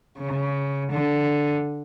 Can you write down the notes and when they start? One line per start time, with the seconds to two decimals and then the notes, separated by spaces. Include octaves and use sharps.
0.19 C#3
0.91 D3